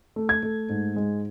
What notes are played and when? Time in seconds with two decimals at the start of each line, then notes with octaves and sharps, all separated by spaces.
0.16 A3
0.29 G#6
0.43 A3
0.69 G#2
0.96 G#3